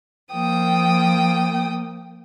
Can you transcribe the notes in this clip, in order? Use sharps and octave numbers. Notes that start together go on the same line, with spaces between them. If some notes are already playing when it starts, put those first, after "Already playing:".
F3 A#3 G5 D#6